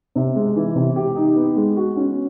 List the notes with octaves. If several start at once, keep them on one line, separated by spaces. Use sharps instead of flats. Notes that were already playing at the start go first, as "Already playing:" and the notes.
C3
G#3
E3
C3
G4
D#4
B3
G#3
F#4
C#4